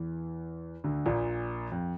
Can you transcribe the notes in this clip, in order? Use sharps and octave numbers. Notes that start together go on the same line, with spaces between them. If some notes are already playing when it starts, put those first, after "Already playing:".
Already playing: E2 E3
D2 D3
A#1 A#2
F2